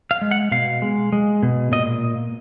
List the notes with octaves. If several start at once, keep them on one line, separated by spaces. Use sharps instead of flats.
F5
G#3
F#5
B2 F5
G#3
G#3
B2
A#2 D#5